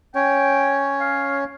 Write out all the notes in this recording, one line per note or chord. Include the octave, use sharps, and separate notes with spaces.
C#4 C#5 G5
F5